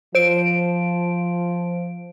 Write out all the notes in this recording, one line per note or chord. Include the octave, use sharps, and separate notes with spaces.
F3 C5 D7